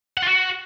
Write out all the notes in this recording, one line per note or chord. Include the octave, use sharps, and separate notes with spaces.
F#5
F4
F#4